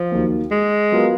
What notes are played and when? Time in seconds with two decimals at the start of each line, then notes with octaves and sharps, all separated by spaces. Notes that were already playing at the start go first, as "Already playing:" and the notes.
Already playing: F3
0.12 D#2 D#3 F#3 A#3
0.51 G#3
0.92 F#3 B3 F4 A#4